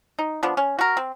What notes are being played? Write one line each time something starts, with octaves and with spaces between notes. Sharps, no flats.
D#4
F3 B3 D4
C#4
F#4 A#4
C4